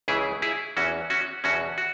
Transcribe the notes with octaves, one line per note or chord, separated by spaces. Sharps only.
C#2 C#3 E3 E4 G#4
E4 G#4
E2 E3 C#4 F#4
C#4 F#4
E2 B2 C#4 F#4
F#4